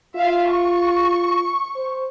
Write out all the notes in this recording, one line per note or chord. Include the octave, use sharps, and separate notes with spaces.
F4 E5 F5
C#6
C5